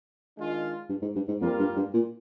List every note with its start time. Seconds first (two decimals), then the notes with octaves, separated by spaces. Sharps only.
0.37 D#3 G#3 D4 F4
0.89 G2
1.02 G#2
1.15 G2
1.28 G#2
1.41 F2 G3 A#3 F4
1.59 G2
1.76 G2
1.94 A#2